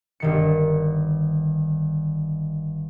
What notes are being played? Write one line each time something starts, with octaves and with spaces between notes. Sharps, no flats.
G1 D#3 C#7